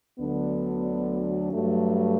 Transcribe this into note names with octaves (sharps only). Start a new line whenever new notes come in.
D2 D3 F#3 B3 D4
G2 F#3 A3